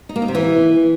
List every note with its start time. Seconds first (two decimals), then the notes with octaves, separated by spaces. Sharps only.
0.09 D#4
0.16 A#3
0.22 D#4
0.28 C3
0.35 E3